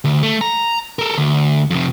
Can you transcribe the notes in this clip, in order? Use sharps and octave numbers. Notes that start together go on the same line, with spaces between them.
D2
A3
A#5
A4 A#4
D2
F2 C3